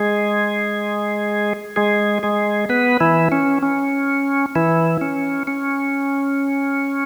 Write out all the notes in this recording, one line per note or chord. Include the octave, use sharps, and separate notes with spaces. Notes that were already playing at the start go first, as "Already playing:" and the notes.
Already playing: G#3 G#4
G#3 G#4
G#3 G#4
B3 B4
E3 E4
C#4
C#4
E3 E4
C#4
C#4